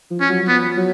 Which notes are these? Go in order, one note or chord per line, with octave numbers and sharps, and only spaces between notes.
F3
C#4
F#3
F#3
F3 B3
F#3